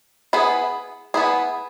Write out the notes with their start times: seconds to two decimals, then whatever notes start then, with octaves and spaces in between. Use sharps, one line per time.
0.33 B3 E4 G#4
1.14 B3 E4 G#4